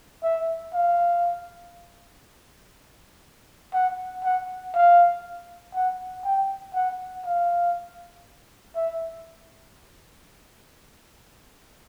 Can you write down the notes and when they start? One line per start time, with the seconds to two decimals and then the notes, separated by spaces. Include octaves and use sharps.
0.23 E5
0.74 F5
3.74 F#5
4.24 F#5
4.75 F5
5.75 F#5
6.25 G5
6.75 F#5
7.25 F5
8.76 E5